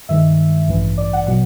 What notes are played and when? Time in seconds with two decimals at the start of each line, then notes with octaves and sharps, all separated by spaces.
0.09 G2 D#3 G#3 E5
0.68 A1 G2 E3
0.98 D5
1.13 F#5
1.27 B2 F#3 F#5